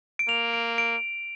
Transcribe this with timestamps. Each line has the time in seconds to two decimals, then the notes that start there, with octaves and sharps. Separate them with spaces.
0.19 D7
0.28 A#3 F7
0.53 D7
0.78 D7